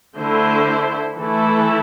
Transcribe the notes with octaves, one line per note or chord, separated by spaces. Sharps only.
D3 A3 E4 C5
E3 A3 E4 A4